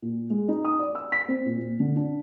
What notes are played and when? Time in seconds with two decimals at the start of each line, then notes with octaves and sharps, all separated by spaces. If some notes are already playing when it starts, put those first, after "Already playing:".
0.02 A#2
0.30 G#3
0.48 D#4
0.64 D#6
0.79 D5
0.95 E6
1.12 B6
1.28 C4
1.46 A#2
1.59 A#2
1.80 D3
1.96 D4